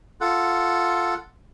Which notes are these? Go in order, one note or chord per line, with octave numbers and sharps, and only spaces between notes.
F4 A4 F#5